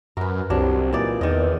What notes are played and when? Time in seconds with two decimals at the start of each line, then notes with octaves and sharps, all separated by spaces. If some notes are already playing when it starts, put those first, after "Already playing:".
0.17 F#2 A#4 B4
0.50 C2 F#3 C4 D4 G4
0.93 A#2 E3 D#4 D5
1.21 E2 D#3 B3 D#5